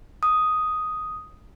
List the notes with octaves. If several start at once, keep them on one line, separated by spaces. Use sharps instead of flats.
D#6